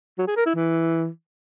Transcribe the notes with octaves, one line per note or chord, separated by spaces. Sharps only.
F#3
G#4
A#4
E4
E3